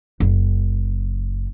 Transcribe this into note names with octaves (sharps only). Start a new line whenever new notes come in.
F#1